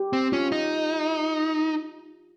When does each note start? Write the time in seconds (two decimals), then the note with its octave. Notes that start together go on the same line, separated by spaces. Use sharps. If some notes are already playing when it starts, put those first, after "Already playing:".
Already playing: G4
0.13 C4
0.32 C#4 F4
0.52 D#4